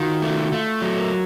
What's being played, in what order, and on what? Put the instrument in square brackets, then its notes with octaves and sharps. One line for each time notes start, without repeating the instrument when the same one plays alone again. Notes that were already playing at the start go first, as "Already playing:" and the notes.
Already playing: [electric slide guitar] D#3 [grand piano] F4 F#4
[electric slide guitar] A3
[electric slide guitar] A3 [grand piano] F4
[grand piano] F4
[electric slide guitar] F#3 [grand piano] A4
[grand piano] A#4